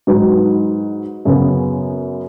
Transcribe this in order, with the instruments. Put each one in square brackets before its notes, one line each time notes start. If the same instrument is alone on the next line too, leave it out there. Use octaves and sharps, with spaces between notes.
[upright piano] G#2 F#3 D#4 F#4 B4
F#2 C#3 B3